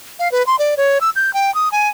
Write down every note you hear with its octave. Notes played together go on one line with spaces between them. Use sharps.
F5
B4
C6
D5
C#5
E6
G6
G5
D#6
G#5